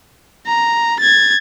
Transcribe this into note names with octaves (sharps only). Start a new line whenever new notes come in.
A#5
G#6 A6